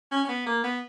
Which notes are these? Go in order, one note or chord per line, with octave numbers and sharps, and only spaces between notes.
C#4
C#4
B3
A#3
B3